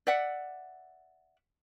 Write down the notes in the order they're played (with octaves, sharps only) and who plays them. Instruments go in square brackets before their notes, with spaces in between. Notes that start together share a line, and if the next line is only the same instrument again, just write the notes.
[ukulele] D5 E5 F#5